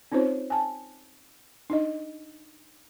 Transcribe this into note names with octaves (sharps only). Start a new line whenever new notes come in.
C4 C#4 D#4 F4 C5 C#5
G#5 A5
D4 D#4 D#5